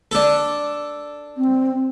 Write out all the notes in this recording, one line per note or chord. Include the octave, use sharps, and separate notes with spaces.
D4 A4
C4